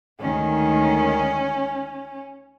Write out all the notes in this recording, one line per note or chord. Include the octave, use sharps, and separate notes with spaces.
D2 D#3 G#3 C#4